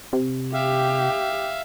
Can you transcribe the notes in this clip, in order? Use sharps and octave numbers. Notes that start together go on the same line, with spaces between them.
C3
G4 E5 F5